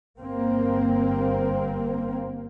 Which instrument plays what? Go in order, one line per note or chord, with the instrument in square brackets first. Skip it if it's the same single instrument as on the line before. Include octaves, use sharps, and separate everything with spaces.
[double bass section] G1 A#3 C4